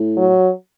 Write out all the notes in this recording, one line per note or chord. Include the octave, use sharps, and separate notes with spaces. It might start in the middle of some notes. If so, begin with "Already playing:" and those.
Already playing: A2
F#3